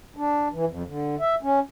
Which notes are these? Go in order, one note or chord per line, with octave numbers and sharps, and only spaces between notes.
D4
E3
F2
D3
E5
C#4